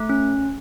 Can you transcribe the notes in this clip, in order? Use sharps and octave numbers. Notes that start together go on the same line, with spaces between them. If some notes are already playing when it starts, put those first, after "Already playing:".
Already playing: A3
C#4